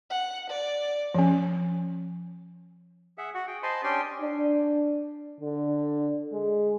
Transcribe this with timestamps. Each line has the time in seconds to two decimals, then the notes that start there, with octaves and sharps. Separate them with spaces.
0.11 F#5
0.50 D5
1.14 F3 C#4
3.18 G#4 E5 F#5
3.34 F#4 F#5
3.47 G#4 G5
3.63 C5 D#5 G#5 A5 B5 C6
3.84 C#4 D4 G4 G5 G#5 C6
4.20 D4
5.40 D3
6.32 G#3